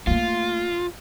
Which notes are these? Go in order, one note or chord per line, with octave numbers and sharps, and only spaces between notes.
A3 A#3 F4